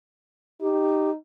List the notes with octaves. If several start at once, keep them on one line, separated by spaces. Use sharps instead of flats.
D#4 G4